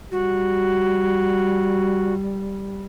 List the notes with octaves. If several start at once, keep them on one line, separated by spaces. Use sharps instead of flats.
G3 F#4